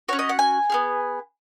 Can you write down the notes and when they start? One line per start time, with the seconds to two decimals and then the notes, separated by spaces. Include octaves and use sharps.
0.09 C#4 F#4 C#5
0.19 D#5
0.29 F#5
0.39 G#5
0.70 B3 F4 G#4